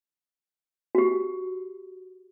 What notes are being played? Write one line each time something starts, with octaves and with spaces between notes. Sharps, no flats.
F#4 G4